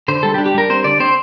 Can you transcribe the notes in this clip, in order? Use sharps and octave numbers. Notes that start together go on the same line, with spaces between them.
D3 C5
G3 A4
G4
D4
G4
G3 A#4
C4 C5
D3 D5
C4 C5